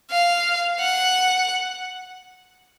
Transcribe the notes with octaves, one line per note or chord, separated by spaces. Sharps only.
F5
F#5